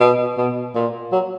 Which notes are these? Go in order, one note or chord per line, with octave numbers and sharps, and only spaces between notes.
B2
B2
A#2
F#3